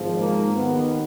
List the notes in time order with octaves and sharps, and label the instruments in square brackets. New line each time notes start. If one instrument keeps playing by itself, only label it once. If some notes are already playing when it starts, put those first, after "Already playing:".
Already playing: [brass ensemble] G#1 G#2 F3
A#3
D#2 D#3 B3